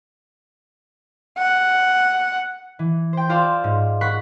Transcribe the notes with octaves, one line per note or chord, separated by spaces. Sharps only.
F#5
E3
C5 G5
F4 A4 C5 D5 F5
G#2
F#5 B5 C#6 F#6 C7